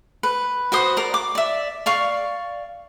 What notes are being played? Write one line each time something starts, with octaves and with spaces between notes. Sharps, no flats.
B4
F#4 B4 C5 D#6
A#4 D5
D6
D5 E5
D5 F5 C#6